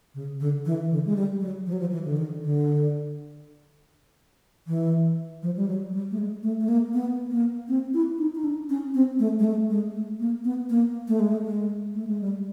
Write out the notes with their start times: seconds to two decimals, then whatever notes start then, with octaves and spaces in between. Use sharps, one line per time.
0.15 C#3
0.40 D3
0.66 E3
0.91 D3
1.05 G#3
1.16 G3
1.41 F#3
1.66 F3
1.73 F#3
1.80 F3
1.91 E3
2.05 D3
2.17 D#3
2.42 D3
4.67 E3
5.43 F3
5.57 G3
5.68 F#3
5.93 G3
6.11 A3
6.18 G#3
6.43 A3
6.61 A3
6.68 A#3
6.94 B3
7.31 A#3
7.69 C4
7.94 E4
8.18 D#4
8.35 D#4
8.44 D4
8.70 C#4
8.95 C4
9.19 A3
9.39 G#3
9.44 A3
9.70 G#3
9.95 A3
10.20 A#3
10.44 B3
10.70 A#3
11.08 A3
11.20 G#3
11.32 A3
11.46 G#3
11.94 A3
12.07 G#3
12.21 G3